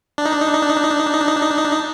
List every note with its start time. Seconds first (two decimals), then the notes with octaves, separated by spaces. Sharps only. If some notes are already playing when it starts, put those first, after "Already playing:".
0.18 D4
0.26 D#4
0.33 D4
0.40 D#4
0.47 D4
0.54 D#4
0.62 D4
0.70 D#4
0.76 D4
0.84 D#4
0.91 D4
0.99 D#4
1.06 D4
1.13 D#4
1.21 D4
1.28 D#4
1.36 D4
1.43 D#4
1.50 D4
1.58 D#4
1.65 D4
1.72 D#4